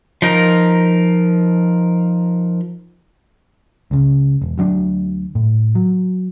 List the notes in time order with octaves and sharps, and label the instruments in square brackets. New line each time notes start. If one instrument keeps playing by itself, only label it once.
[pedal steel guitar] F3 D#4 A#4
[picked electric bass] C#2 C#3
E1
D2 F#3 C#4 D4
A2
F#3